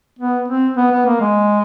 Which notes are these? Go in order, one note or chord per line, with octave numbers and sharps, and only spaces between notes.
B3
C4
B3
B3
A#3
G#3